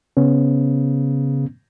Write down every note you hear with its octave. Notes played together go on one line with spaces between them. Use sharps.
C#3 B3 C#4